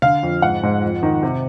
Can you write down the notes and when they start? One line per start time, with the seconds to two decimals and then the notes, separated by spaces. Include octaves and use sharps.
0.02 D3 F5
0.23 F2
0.42 G#2 F#5
0.63 G#2
0.83 F2
1.03 D#3
1.23 C3